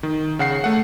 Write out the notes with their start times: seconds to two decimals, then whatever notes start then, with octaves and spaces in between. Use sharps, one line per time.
0.03 D#3
0.39 C#3 F#5 C7
0.64 A3 F#5